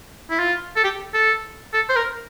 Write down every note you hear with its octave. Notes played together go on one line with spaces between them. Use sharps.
E4
F4
A4
G4
A4
A4
C5
A#4